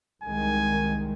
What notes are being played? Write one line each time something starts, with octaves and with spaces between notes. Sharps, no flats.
C2 D#3 G#3 G#5